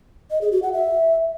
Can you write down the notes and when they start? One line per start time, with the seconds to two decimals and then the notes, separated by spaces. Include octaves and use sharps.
0.31 D#5
0.41 G#4
0.52 F#4
0.62 F#5
0.73 E5